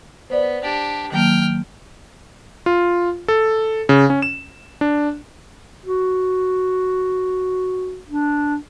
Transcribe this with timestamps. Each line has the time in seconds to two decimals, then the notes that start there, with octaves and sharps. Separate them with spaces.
0.30 B3 C5 D5
0.62 D4 G4
1.12 D#3 F#3 A#3 G5 F6
2.66 F4
3.28 A4
3.89 C#3
4.10 C#4
4.22 E7
4.81 D4
5.86 F#4
8.08 D4